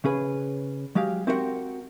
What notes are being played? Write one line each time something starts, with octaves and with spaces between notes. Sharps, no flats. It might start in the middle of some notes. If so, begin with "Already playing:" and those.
C#3 C#4 G#4 B4
F#3 G#3 G4 F5
C4 F#4 G4 A#4 D#5 F#5